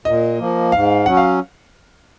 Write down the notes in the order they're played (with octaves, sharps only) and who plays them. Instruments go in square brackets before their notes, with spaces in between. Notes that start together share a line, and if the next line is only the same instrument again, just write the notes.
[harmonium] A#2 [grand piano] D#5
[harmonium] F3 A#3
[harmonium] G#2 [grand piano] F5
[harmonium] F#3 C#4 [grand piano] F#5
[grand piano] F5